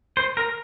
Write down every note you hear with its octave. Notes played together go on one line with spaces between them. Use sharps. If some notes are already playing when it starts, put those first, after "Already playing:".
C5
A#4